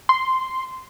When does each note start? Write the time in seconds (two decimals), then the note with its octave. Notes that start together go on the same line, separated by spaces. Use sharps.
0.09 C6